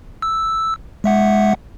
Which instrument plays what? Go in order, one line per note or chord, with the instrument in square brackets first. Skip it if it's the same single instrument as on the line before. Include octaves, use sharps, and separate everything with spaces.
[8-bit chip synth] E6
G#3 E5 F#5